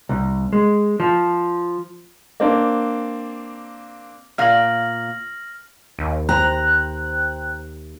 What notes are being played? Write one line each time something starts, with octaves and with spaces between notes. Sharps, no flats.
C2
G#3
F3
A#3 C4 D4
A#2 F5 F6 A#6 F#7
D#2
C5 G5 A#5 F#6